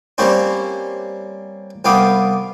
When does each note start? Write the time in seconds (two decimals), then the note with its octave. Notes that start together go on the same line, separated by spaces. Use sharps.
0.18 G3 A#3 C4 C#4 C5
1.85 C2 B3 F5 G5 D6 D#6